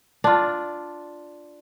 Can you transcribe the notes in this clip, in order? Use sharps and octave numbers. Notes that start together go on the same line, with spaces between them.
D4 F4